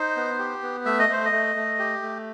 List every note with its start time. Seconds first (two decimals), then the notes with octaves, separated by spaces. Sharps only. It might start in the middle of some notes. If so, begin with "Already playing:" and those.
Already playing: D#4 C5
0.16 B3
0.39 G4
0.63 B3
0.85 A3 E5
0.99 D#5
1.09 A3 C5
1.25 D#5
1.32 A3
1.56 A3
1.79 G4
2.02 A3